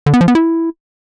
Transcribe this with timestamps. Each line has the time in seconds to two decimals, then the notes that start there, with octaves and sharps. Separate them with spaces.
0.06 D3
0.14 B3
0.21 F3
0.28 B3
0.35 E4